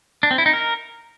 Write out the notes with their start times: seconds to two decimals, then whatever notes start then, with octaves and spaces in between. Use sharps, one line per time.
0.23 D4
0.31 C4
0.38 E4
0.46 D#4
0.53 A#4